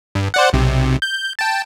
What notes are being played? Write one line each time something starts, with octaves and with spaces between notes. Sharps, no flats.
G2
C5 D5 F#5
B1 C3
G6
G5 A5